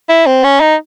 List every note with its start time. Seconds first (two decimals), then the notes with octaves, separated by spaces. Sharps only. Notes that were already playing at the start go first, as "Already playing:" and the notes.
0.09 E4
0.27 C4
0.44 C#4
0.61 D#4